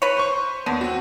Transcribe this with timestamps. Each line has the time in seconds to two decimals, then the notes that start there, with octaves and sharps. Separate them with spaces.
0.02 B4 C#5
0.17 C5 C6 C#6
0.66 D#2 D3 B3 D#7
0.81 C4 F#4